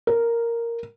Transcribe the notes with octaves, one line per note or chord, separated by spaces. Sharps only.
A#4